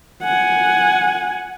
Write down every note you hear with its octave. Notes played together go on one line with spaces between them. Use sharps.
F#5 G#5